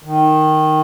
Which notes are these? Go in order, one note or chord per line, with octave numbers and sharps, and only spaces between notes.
D#3